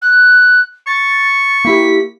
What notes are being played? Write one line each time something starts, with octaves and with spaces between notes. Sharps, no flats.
F#6
C#6 A6
A#3 E4 G4 B6